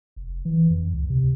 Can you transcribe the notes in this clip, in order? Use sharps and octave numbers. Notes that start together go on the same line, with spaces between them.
F1
E3
F2
C#2
C3